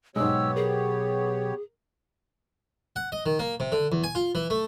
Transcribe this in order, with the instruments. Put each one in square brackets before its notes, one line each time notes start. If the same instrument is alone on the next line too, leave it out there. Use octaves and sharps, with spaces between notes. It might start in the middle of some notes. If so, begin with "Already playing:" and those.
[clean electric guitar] B1 [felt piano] G#2 G#3 [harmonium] B3 G4 C#5 [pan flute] E6
[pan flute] G#4 [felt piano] A#4
[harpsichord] F#5
D#5
D#3
A#3
C3
D3
E2
G#5
F4
E3
A3